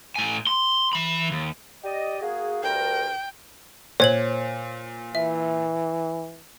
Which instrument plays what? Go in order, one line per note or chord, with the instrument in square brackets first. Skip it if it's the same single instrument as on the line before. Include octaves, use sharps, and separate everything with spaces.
[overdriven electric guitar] A2 G#5
C6
E3 B5
D#2
[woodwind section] G4 D5 D#5
A#3 F#4 G#4
[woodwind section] D2 G2 A#4 [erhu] G5
[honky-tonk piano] A#2 [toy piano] C5 [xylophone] C#5 G#6 F#7
[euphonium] E3 [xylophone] E5